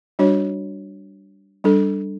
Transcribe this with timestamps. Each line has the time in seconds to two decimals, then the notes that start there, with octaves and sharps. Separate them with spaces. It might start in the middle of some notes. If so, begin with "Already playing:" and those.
0.19 G3 D4 F#4 C#5
1.64 G3 D4 A4